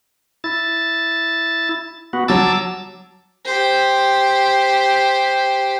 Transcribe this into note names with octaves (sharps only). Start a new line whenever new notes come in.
E4 A6
B3 F#4
F#3 A5 D6 E6 A6
G4 C5